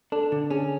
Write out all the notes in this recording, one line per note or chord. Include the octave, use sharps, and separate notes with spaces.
D4 A4
D3
C#4 G#4